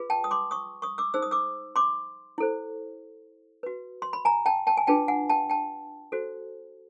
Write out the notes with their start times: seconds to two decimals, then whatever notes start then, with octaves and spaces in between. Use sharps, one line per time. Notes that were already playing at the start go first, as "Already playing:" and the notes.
Already playing: F4 G#4 B4
0.10 G5 A5
0.24 D#6
0.31 C6 D6
0.51 C#6 D#6
0.82 C#6 D#6
0.98 D6 E6
1.14 D#4 G#4 C5 E6
1.22 D#6
1.31 D6 E6
1.76 C6 D6
2.38 E4 A4 C5
3.63 F#4 B4
4.02 C6
4.13 B5
4.25 G#5 A#5
4.46 G5 A5
4.67 G5 A5
4.77 G#5
4.87 D4 F4 G#4 B4 G5 A5
5.08 F#5 G#5
5.29 G5 A5
5.50 G5 A5
6.12 F#4 A4 C5